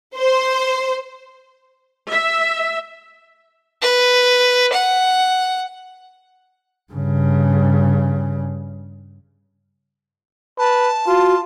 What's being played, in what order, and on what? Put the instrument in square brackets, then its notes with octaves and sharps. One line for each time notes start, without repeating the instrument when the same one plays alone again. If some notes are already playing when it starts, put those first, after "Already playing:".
[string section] C5
[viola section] E5
[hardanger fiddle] B4
F#5
[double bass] G2 C#3
[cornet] B4 [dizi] A5
[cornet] F4 [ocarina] F#4